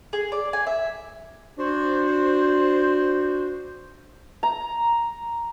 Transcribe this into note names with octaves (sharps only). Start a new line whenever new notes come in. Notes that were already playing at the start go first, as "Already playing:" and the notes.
G#4
D5
G#5
E5
D4 F#4 C5
A#5